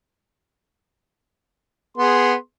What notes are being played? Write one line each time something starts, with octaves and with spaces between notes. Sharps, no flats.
B3 G#4 C6